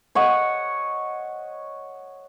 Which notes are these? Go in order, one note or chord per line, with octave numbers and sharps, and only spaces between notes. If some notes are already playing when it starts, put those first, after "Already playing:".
C#5 D#5 F#5